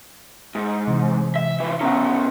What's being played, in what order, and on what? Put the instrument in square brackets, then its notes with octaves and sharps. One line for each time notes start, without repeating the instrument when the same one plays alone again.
[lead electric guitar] G#2
[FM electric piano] C3 E3
[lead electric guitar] E5
E3 F4
[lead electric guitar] B2 C#4 [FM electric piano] F#5 A#5